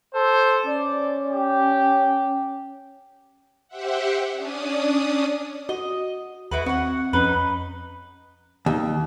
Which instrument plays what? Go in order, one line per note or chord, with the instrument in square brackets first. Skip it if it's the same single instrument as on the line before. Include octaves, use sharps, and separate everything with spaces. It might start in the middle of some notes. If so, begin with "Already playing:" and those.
[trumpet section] A4 C5
[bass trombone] C#4 [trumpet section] D5
[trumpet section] G4
[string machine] G4 C5 E5 F#5
C#4 D4 D5 D#6
[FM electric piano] F#4 [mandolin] D#5
[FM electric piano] D#2 [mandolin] E4 F#4 B4
[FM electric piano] C4 [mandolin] F#4 F#5
[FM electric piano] F2 C#4 [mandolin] D#4 B4
[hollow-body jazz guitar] D#2